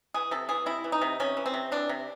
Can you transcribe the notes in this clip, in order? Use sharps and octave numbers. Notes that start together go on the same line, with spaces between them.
E3 G#4
C3 A4
E3 G#4
C3 E4
E3
D#4
C3
C3 C#4
E3
C4
C3
E3 D4
C3